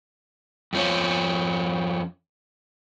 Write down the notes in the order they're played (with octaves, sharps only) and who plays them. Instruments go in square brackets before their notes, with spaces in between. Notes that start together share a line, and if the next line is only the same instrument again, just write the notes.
[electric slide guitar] F2 F3 C#4